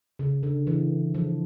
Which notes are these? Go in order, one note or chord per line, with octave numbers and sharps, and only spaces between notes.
C#3
D3
E3
F3